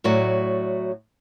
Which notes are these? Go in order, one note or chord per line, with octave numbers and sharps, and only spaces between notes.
A2 F#3 A3 F#4 D5